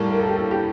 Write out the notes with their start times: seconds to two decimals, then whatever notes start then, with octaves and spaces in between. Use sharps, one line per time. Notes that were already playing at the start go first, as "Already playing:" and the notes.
Already playing: A2 G3 A#3 A4 A#4
0.12 A#4
0.20 A4
0.28 G4
0.36 A4
0.51 G4